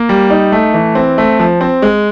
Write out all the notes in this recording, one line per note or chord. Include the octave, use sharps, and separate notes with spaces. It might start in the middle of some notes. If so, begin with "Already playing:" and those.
Already playing: A#3
G3
D#4
A3
E3
C4
A3
F3
C4
G#3